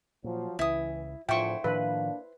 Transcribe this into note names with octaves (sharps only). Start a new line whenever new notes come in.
A#2 F3 F#3
C#2 E3 E4 D#6
E2 A2 D3 F3 E4 C5 G5 C#6
A2 D#3 F3 A#3 D4 B4 F5